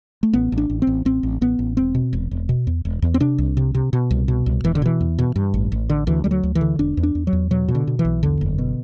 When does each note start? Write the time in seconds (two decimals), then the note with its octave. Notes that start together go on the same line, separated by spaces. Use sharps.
0.23 A3
0.33 A1 B3
0.52 A1
0.58 D4
0.70 A1
0.82 C4
0.87 A1
1.05 A1 C4
1.23 A1
1.41 A1 B3
1.59 A1
1.77 E1 C4
1.95 B2
2.13 E1
2.31 E1
2.49 B2
2.67 E2
2.85 E1
3.02 E2
3.14 C4
3.20 C3 D4
3.38 C2
3.57 C3
3.75 C3
3.93 B2
4.11 C2
4.28 B2
4.46 C2
4.64 E1 E3
4.75 D3
4.82 B2 E3
5.01 E2
5.19 B2
5.36 G2
5.54 A1
5.72 A1
5.90 D3
6.07 D2 E3
6.24 D2 G3
6.31 F#3
6.43 D2
6.55 E3
6.61 D3
6.79 E1 D4
6.97 E2
7.03 D4
7.15 E2
7.27 F#3
7.33 E2
7.51 B2 F#3
7.68 B2
7.75 D3
7.87 B2
7.99 E3
8.05 B1
8.23 E2 D3
8.41 F#1
8.58 B2